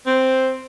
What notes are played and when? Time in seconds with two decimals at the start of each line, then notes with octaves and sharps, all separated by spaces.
0.06 C4